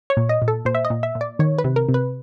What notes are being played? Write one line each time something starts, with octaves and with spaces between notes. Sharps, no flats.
C#5
A#2
D#5
A#2
A4
A#2 C5
E5
D#5
A#2
E5
A#2
D5
D#3 C#5
B4
C3
A#4
C3
B4